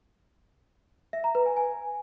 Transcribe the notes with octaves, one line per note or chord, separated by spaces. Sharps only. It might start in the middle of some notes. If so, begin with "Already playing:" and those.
E5
A#5
B4
G#5
G#5